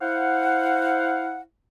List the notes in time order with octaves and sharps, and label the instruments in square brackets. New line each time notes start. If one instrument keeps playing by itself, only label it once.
[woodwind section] E4 C5 F5 F#5